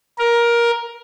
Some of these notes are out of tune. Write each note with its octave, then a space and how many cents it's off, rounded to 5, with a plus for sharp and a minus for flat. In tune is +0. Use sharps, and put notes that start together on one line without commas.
A#4 +15